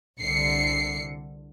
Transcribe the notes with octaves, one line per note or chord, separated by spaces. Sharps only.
C2 D3 C7 C#7